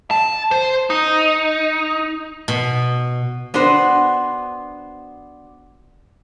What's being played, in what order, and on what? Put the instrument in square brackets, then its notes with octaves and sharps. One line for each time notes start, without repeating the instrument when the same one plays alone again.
[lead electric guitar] A5
C5
D#4
[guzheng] B2
[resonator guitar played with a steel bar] B3 D4 F#4 C5